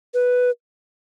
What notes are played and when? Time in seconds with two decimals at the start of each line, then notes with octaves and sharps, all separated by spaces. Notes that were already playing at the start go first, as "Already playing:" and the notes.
0.14 B4